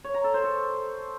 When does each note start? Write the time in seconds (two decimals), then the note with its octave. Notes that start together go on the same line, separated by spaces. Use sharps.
0.04 C#5
0.14 A#5
0.24 A4
0.34 C5
0.44 A4